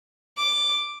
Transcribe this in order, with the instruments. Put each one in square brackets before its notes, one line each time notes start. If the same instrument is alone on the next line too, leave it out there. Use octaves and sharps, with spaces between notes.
[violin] D6